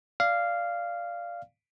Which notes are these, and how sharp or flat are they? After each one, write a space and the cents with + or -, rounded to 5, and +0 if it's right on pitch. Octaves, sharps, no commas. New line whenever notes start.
D5 +0 F5 -10